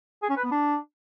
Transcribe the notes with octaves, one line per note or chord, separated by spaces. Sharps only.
G#4
C#4
B4
B3
D4